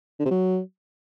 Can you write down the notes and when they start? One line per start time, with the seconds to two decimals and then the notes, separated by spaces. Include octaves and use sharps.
0.20 D3
0.25 C3
0.31 F#3